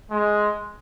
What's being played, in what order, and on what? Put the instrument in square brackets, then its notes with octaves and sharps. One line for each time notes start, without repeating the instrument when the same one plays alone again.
[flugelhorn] G#3